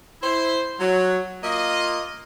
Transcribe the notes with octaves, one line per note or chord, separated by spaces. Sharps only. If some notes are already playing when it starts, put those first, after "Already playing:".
E4 C5
F#3
A#3 F4 D#5